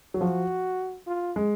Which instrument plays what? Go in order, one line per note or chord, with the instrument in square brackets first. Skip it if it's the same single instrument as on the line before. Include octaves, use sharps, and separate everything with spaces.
[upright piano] F#3
[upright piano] F3 [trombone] F#4
[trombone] F4
[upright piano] G#3